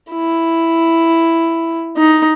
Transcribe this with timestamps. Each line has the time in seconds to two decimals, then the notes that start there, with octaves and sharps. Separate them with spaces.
0.12 E4
1.97 D#4